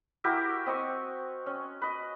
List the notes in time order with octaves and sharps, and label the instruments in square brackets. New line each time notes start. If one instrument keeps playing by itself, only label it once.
[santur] E4 F#4 G4 A#4
C4 D#5 G#5 C#6
C#4
B4 D#5